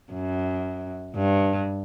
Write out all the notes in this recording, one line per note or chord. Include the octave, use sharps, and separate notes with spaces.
F#2
G2